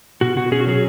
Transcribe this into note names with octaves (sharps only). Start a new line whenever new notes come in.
B2 F#4
B2 F#4
C#4 G#4
F#4
F#3 G#4